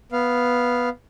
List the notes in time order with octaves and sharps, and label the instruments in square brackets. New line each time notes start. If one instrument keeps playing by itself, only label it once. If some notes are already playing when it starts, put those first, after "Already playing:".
[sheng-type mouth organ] B3 F5